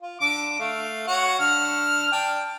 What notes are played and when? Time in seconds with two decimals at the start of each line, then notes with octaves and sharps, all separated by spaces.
0.02 F4
0.20 D3 D6
0.59 A3 F5
1.07 F#4 C#5 F#5
1.39 D3 F6
2.12 D4 G5